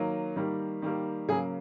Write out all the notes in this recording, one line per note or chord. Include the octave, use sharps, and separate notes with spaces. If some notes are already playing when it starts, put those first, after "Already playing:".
Already playing: D#3 F#3 A#3
D#3 G3 A#3
D#3 G3 A#3
C#3 F#3 A#3 G#4